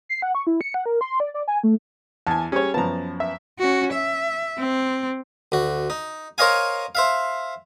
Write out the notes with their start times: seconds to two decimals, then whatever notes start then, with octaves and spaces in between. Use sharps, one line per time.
0.09 C7
0.22 F#5
0.35 C#6
0.47 E4
0.61 C#7
0.74 F#5
0.86 A#4
1.01 C6
1.20 D5
1.34 D5
1.48 G#5
1.64 A3
2.27 E2 G#5 A5
2.52 G3 C#4 G#4 C#5
2.74 F#2 F3 B3 A5 A#5
3.20 E5
3.59 C#4 F#4
3.93 E5
4.59 C4
5.52 D2 F#4
5.90 D#4
6.38 A#4 C5 C#5 D#5 F5 G#5
6.95 C5 E5 F5